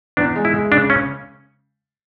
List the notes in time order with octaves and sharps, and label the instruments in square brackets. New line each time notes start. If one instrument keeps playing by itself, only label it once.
[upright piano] E2 [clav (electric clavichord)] D4
[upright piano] G#3
[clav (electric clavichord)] E4
[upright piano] G#3
[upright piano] C#3 [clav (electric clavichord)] D4
[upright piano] C#3 [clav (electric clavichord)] C#4